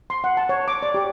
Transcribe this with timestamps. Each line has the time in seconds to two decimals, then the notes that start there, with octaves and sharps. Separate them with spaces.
0.10 C6
0.24 F#5
0.37 A5
0.49 C#5
0.68 D6
0.82 D5
0.94 G4